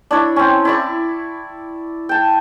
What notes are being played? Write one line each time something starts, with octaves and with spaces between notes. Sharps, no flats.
D4 E4 C#5
C4 C#4
E4 D5 C#6
G5 A5